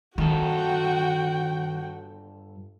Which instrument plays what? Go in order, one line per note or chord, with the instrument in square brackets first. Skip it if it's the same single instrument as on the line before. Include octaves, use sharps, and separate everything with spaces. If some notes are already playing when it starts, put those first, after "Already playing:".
[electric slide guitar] G2 F4 A4 [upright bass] D#3 [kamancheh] F#4 G5